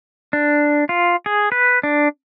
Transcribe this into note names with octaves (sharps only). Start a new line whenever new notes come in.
D4
F4
G#4
B4
D4